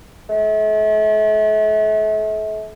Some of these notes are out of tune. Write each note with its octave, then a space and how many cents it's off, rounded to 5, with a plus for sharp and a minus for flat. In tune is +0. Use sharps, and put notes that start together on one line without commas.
A3 -40